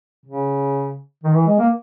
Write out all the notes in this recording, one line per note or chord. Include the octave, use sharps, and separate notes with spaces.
C#3
D#3
E3
G#3
A#3